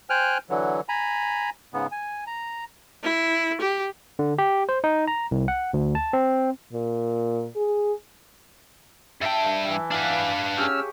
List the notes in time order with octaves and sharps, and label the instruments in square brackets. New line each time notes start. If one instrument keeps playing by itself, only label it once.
[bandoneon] C5 G5 G#5 F6 F#6
D3 E3 F#3
G#5 A#5 B5
G#2 C#3 B3
G#5
A#5
[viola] E4
G4
[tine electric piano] D3
G4
C5
D#4
A#5
C2
F#5
D2
A5
C4
[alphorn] A#2
G#4
[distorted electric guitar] G2 G5 [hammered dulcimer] E5 A5
[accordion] E3
[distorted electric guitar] D4 B4 [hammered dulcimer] F5 F#5
[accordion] C#4 E6 F6 [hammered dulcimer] G4 G#4 C#5